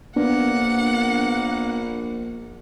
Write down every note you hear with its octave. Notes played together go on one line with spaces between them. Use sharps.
A#1 A#3 B3 D4 F#5